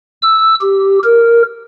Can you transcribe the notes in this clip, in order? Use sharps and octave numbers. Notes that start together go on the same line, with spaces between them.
E6
G4
A#4